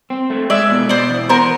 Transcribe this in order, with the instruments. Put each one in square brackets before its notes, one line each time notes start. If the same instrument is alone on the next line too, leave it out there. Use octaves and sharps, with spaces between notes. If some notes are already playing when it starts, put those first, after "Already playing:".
[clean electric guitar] C4
A3
[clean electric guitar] G#3 [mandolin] D5 E5
[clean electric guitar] B2
[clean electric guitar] B2 [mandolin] C5 D5
[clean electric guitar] E2
[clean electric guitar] B3 [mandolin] A#4 C5